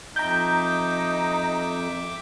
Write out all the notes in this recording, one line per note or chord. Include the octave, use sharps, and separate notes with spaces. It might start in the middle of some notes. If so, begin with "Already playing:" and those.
F2 D#4 E5 G5 A#5 D6 G6